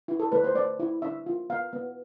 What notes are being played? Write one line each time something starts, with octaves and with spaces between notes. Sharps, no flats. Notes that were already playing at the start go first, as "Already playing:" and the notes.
E4
A4
A3 B4
C5
A3 D5
E4
D4 E5
F4
B3 F5
B3